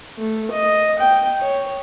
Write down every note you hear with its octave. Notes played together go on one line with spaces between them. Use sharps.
A3
D#5
G5
C#5